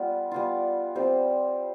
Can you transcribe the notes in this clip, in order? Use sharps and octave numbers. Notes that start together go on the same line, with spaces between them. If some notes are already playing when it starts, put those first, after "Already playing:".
Already playing: G3 B3 F4 B4
G3 B3 F4
G3 C4 G4 C5